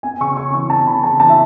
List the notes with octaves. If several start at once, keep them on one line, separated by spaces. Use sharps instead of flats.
B3 G#5
C#3 C#6
C#3 C#6
E3 C#6
B3 A5
C#3 B5
C#3 A5
E3 A5
E5